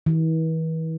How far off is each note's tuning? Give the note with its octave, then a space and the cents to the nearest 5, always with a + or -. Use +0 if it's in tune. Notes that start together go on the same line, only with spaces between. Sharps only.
E3 -40